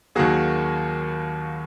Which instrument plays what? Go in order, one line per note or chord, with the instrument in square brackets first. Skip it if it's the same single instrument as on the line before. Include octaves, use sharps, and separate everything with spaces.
[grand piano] D#2 D#3 F#3 A#3 F#4 G#4